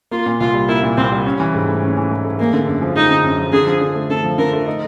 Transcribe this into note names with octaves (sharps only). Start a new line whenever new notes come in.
A#3 F4
A#2
C2 F4
G3
A#3 E4
A#2
C2 C4
G3
C#4
E3
G#2
A3
C#4
E3
G#2
A3
G#3 A#3
D3
F#2
F3
G#3 D#4
D3
F#2
F3
D3 G#4
F3
D3
A3
D3 A4
F3
D3 A#4
A3
D#4